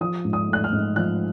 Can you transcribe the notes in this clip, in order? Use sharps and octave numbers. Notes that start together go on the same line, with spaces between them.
F3 D#6
G#2
D#6
A3 F#6
F6
G#2
F3 F#6